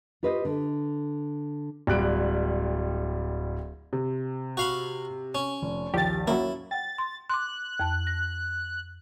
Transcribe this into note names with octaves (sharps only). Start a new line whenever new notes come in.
F4 G4 B4 C5 D#5
D3
D1 G3 F#6 D7
C3
F#4 F5 B5
C#4
F1
A#1 D#2 G4 A6
F#3 A#3 C#4 E4 F#4
F#5 G5 A6
C6
C6 D6 F#6
F2 A5
A#6